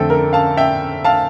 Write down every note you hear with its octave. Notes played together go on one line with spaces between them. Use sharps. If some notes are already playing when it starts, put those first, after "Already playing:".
Already playing: F2 D3 A3 C4 A4 G5
A#4
F5 A5
E5 G5
F5 A5